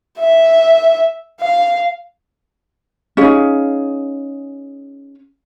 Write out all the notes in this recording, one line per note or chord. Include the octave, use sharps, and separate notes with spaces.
E5
F5
C#4 D#4 G#4 F5